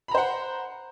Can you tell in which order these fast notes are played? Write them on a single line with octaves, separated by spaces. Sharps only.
B5 A#5 C5 F#5